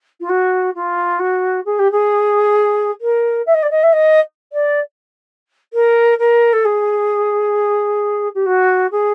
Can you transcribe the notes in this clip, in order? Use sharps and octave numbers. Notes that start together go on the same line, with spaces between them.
F4
F#4
F4
F#4
G#4
G4
G#4
A#4
E5
D#5
D5
D#5
E5
D#5
D5
A#4
A#4
A4
G#4
G4
F#4
G#4